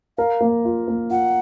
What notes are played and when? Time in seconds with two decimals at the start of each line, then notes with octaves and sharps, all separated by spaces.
0.18 A#4 F5
0.41 A#3
0.65 F4
0.88 A#3
1.10 F4 F#5